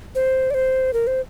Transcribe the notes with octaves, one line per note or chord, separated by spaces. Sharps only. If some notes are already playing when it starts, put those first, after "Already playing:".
C5
D5
C5
A#4
C5